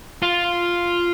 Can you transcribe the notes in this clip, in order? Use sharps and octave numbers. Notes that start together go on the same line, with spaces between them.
F4